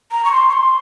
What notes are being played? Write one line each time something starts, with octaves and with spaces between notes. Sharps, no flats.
A#5
C#6
C6
C#6
C6